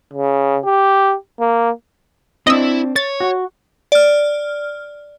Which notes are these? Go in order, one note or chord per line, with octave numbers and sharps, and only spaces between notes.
C#3
G4
A#3
C4 D4 E4 D#5 E6
C#5 A6
F#4
D5 F6